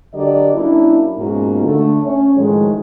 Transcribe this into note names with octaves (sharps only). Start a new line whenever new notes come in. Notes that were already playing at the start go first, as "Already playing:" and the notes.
D3 F#3 G4 A#4 D5 D#5
F#3 A#3 C#4 D4 E4
G#2 B2 A#3 C#4 F4 F#4
D3 A3
C#4 C#5
A2 D#3 F3 F#3 G#3